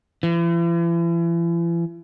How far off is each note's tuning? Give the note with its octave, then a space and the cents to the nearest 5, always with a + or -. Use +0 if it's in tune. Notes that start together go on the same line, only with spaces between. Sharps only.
E3 +40